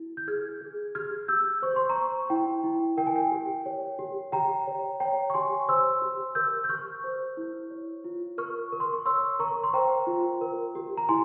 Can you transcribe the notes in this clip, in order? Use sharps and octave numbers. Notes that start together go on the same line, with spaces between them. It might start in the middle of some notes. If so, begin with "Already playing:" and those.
Already playing: E4
G6
G#4 F6 G#6
G#4
G4 F6 G#6
G4 E6 G6
C5 C#6
C6
A#5 C#6
C5
E4 G5
E4
A#4 G5
G#5
G5
G4
C#5
G4
G4 G5 A#5
C#5
C#5 G5 A#5
C#6
G4 G#5 C6
C5 C6 E6
G4
A#4 E6 G6
G6
G4 C#6 F6
C5
E4
C#5
F4
A#4 C#6 F6
A#4
C6
C#6
C#5 C6 E6
A#4 A#5 C#6
C6
C5 G5 A#5
F4
A#4
G4
A#5
E4 G#5 C6